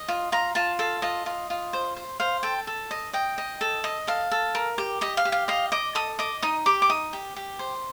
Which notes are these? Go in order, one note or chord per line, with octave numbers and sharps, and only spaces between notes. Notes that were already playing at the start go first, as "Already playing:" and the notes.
Already playing: D#5
F4
F4 A#5
F4 A5
A4 F5
F4 D#5
F4
F4
C5
C5
C5 F5
A4 G5
A4
D#5
D#5 G5
D#5
A4
D#5
A4 F5
A4
A#4
G4
G4 D#5
F5
G4
F5
D#5 F5
D#5 D6
A4 D#6
D#5 D6
D#4 D#6
G4 D6
D6
D#4 D#6
G4
G4
C5